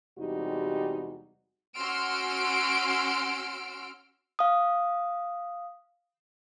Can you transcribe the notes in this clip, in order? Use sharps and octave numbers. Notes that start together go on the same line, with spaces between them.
E2 C3 G3 G#3 D#4 F#4
C#4 F#4 C6 E6 F6 D7
F5 D#6